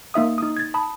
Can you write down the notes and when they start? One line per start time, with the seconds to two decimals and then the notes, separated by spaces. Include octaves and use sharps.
0.14 A#3 D#4 E5 D#6
0.38 D#4 D#6
0.57 G#6 A6
0.74 A5 B5 D#6